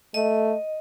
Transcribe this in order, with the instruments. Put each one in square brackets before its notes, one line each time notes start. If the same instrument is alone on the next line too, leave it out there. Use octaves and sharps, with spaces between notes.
[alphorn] A3 [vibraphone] D#5